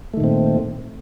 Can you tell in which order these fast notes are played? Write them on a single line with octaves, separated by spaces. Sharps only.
A3 D#3 A#2 C4